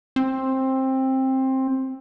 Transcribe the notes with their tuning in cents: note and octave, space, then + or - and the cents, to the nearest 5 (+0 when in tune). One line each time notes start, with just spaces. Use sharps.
C4 +15